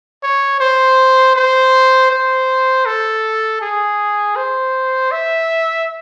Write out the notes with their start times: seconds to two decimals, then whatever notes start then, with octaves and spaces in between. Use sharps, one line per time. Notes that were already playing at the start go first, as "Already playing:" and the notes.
0.23 C#5
0.60 C5
1.36 C5
2.11 C5
2.86 A4
3.61 G#4
4.36 C5
5.11 E5